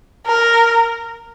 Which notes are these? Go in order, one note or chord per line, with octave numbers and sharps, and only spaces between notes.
A#4